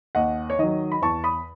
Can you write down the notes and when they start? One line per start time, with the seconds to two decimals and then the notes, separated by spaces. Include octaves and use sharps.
0.15 D#2 D#5 F#5
0.50 C#5
0.59 D#3 F#3 D#5
0.92 B5
1.02 E2 A5 C#6
1.24 B5 D#6